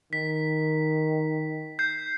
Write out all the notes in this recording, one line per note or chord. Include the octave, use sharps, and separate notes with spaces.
D#3 B6
G6 C7